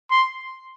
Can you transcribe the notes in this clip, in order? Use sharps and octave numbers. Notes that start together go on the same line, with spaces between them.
C6